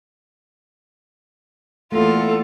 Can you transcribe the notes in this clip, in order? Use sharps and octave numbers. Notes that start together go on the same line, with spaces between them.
E2 A3 A#3 F4 A4